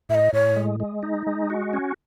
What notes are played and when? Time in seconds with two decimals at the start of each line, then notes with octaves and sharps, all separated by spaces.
0.09 A2 E5
0.14 D#5
0.33 A2 C#5
0.56 G#3
0.80 G#3
1.03 D#4
1.27 G#3
1.50 F#4
1.73 C#4